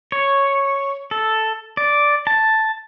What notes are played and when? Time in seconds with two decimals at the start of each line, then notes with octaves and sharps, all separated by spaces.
0.12 C#5
1.11 A4
1.77 D5
2.27 A5